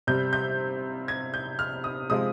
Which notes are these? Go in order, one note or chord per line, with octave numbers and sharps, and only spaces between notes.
C3 G3 G6
G6
G#6
G6
F6
D#6
C3 F3 G#3 D#6